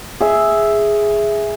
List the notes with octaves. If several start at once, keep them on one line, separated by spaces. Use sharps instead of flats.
G#4 E5